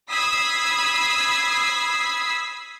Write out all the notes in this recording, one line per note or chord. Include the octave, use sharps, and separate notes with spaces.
B5 D#6 E6 G#6 B6 C7